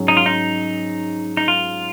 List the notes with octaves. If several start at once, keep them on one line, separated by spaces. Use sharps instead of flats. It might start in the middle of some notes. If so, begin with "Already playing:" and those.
Already playing: G#2 F#3 C#4 G#4
D#4
F4
D#4
D#4
F4